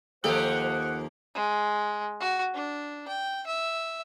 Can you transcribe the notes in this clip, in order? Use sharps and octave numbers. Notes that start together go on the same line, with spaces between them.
D#2 F3 A#3 G4 A4 C5 F#5
G#3
F#4
D4
G5
E5